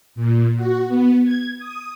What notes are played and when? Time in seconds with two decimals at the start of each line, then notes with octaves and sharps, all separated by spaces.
0.15 A#2
0.56 F#4
0.88 B3
1.24 G#6
1.59 D#6